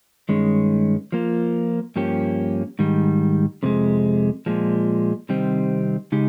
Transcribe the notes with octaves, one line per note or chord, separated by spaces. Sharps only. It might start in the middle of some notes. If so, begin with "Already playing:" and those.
G2 D#3 G#3 C#4
F3 A#3 F4
G2 F3 A#3 C#4 G4
G#2 D#3 G3
F2 C3 G#3
A#2 F3 G#3
C3 D#3 G3 C4
C#3 G#3 D#4 G4